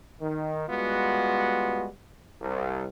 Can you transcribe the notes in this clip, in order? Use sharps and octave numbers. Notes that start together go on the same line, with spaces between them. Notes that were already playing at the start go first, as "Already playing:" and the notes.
D#3
G3 G#3 B3 F4 F#4
C2